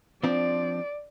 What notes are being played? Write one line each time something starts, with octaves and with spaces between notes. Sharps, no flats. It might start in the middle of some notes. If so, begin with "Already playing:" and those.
F3 C4 D4 D5